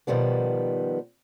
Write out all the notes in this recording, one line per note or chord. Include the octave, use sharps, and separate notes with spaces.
B2 D#3 F3 G3 B3